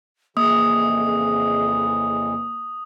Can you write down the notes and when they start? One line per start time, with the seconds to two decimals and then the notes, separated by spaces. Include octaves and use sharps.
0.37 F2 C#3 E3 A#3 G#4 D#6